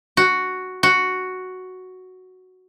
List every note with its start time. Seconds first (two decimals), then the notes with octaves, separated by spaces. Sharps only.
0.17 F#4
0.83 F#4